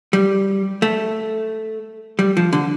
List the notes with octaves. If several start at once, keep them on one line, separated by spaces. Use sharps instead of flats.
G3
A3
G3
F3
D3